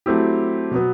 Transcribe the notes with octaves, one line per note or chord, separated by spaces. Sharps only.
F#3 A3 C4 E4 G4
B2 F#3 B3